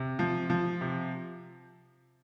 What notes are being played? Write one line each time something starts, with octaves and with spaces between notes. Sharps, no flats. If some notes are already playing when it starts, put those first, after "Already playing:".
Already playing: C3
F3
F3
C3